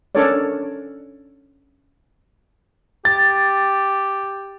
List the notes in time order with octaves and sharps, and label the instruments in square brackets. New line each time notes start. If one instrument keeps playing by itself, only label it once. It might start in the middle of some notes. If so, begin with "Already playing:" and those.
[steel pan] C#4 D4 A4 A#4 C#5 D5
[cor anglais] G4 [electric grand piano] A6